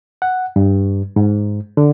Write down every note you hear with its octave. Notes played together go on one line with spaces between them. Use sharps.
F#5
G2
G#2
D3